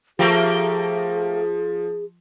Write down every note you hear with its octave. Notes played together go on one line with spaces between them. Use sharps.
F3 A3 A#3 G4 G#4